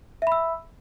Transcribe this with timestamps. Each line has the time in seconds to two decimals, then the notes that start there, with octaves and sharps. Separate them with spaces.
0.22 E5
0.27 B5
0.32 E6